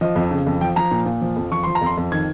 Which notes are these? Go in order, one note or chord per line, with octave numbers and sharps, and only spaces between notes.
F3 D#5
F2
C#3
F2
F3 G5
F3 A#5
A#2
A#2
F3
F2
F3 C#6
F3 C6
A#5
F2 C6
F2
D#3 G#6